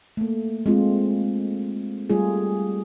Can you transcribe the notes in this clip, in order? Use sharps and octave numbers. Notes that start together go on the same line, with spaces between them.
A3 A#3
G#3 C4 F4
G3 A3 F4 G#4